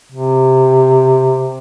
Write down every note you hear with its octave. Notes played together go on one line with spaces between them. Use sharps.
C3